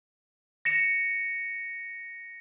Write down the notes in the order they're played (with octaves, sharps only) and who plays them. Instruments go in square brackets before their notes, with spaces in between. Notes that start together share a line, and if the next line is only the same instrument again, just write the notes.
[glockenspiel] A#6 C#7 E7